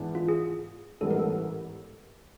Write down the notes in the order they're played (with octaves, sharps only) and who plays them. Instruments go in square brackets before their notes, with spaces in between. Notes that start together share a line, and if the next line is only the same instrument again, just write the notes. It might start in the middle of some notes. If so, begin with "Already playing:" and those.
Already playing: [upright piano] G#2 E3 G#3 B3 D4
[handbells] F4
G#4
[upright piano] A1 G#2 E3 G3 B3 [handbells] A4
[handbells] A#4
A4